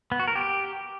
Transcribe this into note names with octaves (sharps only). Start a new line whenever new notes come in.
B3
F#4
A#4
G4